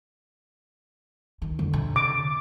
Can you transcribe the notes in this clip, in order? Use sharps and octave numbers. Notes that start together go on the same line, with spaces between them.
D#3
F2 D3
C3
D6